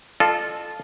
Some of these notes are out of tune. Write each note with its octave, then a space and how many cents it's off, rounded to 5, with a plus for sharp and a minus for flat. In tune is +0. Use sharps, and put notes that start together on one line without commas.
F4 +0 A4 -10 D#5 -45